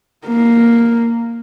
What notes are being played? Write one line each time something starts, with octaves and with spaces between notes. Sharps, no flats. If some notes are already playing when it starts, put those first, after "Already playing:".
A#3